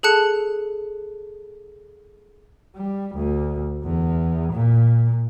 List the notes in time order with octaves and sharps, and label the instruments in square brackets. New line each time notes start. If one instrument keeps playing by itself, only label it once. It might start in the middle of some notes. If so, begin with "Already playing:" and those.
[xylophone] G#4 A4 A5 F#6 C#7
[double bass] G3
D2
E2
A#2